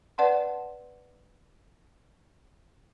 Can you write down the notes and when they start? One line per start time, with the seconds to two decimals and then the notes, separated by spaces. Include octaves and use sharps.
0.18 B4 D5 F#5 A5 C6